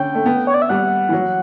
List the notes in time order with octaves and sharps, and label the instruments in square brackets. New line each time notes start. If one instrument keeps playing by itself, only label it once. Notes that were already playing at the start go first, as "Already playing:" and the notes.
Already playing: [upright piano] D3 C#4 [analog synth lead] G5
[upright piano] A3
B3
[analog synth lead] C#5
D5
E5
[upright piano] G3 [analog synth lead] F#5
[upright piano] E3
F#3